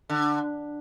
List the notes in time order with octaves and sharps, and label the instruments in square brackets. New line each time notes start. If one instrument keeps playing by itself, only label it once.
[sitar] D3